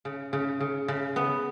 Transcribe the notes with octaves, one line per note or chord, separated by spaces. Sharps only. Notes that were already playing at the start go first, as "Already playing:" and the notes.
C#3
C#3
C#3
C#3
B3